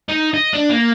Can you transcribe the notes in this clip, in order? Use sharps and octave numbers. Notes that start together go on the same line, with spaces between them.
D#4
D#5
D4
A#3